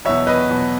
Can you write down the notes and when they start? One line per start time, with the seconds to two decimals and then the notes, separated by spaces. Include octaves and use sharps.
0.05 E2 B2 F#3 C#5 E5
0.27 B4 D#5
0.49 E2 B2 F#3